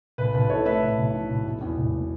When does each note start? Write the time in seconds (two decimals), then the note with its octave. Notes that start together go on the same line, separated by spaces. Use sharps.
0.18 B1 B4
0.34 B1 B4
0.49 E3 A4 C#5
0.65 A2 B4 E5
0.81 B1
0.98 B1
1.14 E3
1.30 B1
1.45 B2
1.61 E2
1.78 E1
1.93 B2